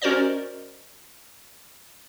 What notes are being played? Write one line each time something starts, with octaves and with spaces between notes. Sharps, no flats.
C#4 F#4 A#4 C5 D5 D#5